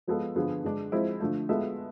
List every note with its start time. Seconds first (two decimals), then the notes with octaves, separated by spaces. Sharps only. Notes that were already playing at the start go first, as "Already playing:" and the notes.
0.07 F3 G#3 B3 F4 A4
0.36 D3 F3 B3 F4 G#4
0.64 D3 G#3 D4
0.92 F3 G#3 C4 E4
1.20 D3 F3 A3
1.49 G#3 B3 F4 A4 E5